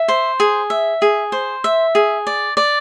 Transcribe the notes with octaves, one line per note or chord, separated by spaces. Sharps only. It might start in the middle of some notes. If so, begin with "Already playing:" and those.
Already playing: E5
C5
G#4
E5
G#4
C5
E5
G#4
D5
D5